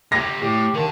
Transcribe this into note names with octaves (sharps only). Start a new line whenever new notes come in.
D3 G4 A#6
A2 G4
D#2 D3 D#3 A5